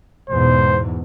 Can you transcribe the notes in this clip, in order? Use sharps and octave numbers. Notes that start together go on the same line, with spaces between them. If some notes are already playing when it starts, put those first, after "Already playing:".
E2 G#2 B2 C5